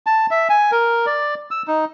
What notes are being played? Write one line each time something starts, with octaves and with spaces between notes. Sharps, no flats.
A5
E5
G#5
A#4
D5
E6
D#4